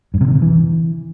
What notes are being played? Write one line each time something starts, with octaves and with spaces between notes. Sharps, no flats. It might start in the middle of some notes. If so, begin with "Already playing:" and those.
G2
C3
D3
C3
E3